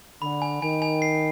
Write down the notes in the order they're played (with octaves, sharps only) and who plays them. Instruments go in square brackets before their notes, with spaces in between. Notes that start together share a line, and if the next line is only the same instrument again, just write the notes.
[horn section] D3 [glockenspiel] B5
[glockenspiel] G#5
[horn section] D#3 [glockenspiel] G#5
[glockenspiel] G#5
C7